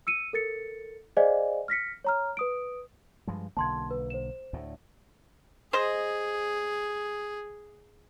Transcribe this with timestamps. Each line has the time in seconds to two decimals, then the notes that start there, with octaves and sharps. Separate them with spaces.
0.07 E6 C#7 D#7
0.33 A4 A#4 A6 C#7
1.17 G#4 C5 D5 D#5 F5 G#5
1.68 F6 A#6 B6 C#7
2.04 C#5 A#5 F6
2.37 B4 D#6 D7
3.27 G2 F3 G#3
3.57 B1 D3 A#3 A5 C6 G#6
3.91 B4
4.10 C5 E7
4.53 D2 A2
5.73 G#4 C5 D#5